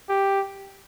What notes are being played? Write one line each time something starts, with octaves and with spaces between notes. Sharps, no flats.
G4